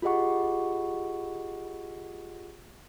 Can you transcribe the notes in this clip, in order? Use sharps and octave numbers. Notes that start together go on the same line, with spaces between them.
F4 G4 G#4 D#5 F#5 C#6